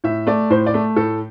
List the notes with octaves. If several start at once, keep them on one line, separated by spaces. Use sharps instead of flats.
A2 E5
A3 D5
A2 C5
D5
A3
A2 A4